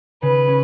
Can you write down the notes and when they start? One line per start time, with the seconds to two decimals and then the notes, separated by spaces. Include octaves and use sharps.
0.22 C#3 B4
0.48 C#4